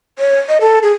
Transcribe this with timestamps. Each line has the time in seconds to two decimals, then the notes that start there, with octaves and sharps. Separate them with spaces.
0.19 C#5
0.49 D#5
0.61 A4
0.83 G#4